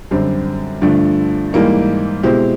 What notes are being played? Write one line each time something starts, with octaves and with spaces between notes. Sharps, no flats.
F#2 D3 G3 C4
G2 D3 F3 A3 D4
G#2 E3 G3 A#3 D#4
B2 G#3 C4 E4 G4